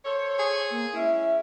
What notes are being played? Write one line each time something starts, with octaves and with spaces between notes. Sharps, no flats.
A4 C5 C#5
G#4
A#3
G#3 C#4 E4 E5